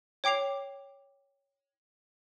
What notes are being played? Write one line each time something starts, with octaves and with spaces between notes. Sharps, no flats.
C#5 G5 D6 C7 F7